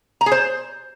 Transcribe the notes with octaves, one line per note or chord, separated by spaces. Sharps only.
A#5
G#4
C5